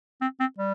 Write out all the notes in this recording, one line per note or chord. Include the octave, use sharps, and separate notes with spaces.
C4
C4
G3